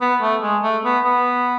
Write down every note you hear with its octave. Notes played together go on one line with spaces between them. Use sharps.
B3
A3
G#3
A3
B3
B3